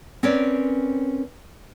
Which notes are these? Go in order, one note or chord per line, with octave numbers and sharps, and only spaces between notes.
C4 C#4 A#4 B4 C#5 D5